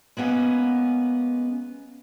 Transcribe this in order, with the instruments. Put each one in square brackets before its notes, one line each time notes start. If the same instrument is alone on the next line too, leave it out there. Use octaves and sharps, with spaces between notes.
[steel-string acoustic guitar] G#3 A#3 B3 C#4